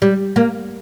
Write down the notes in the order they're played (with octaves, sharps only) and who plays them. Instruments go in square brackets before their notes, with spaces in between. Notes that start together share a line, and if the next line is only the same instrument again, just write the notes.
[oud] G3
A#3